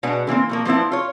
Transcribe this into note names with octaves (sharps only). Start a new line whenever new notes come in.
B2 G#3 D4 B4 F#5
D3 E3 A#3 C4
B2 F3 A#3
F3 B3 C4 E4
F4 C#5